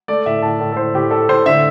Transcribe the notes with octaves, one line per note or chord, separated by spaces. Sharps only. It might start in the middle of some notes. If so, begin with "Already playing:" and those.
A3 D5
A2 E5
A2 A5
A2 A4
A4
A2 C5
A2 G4
A3 A4
A2 C5
D3 E5